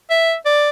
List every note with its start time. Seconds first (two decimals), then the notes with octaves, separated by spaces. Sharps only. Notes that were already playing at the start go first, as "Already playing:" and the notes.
0.10 E5
0.46 D5